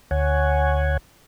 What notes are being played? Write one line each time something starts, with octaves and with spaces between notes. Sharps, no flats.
D2 C#5 F#5 G#5